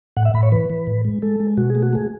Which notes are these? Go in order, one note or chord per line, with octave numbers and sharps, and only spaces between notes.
A2 F#5
E5
A2 B5
C#5
E3 B4
E3
A2
G#3
G#3 A4
G#3
B2 F#4
G#4
A3
F#4
A3 G#4